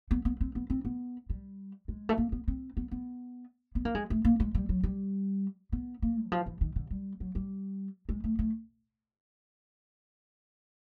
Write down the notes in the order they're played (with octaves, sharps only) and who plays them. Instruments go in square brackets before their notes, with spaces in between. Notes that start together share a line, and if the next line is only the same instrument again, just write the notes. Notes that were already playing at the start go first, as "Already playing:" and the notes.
[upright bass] B3
B3
C4
B3
C4
B3
G3
G#3
A3
A#3
B3
C4
B3
B3
B3
A#3
G#3
A3
A#3
G#3
G3
F#3
G3
B3
A#3
E3
F3
E3
D#3
D3
G3
F#3
G3
G#3
A3
A3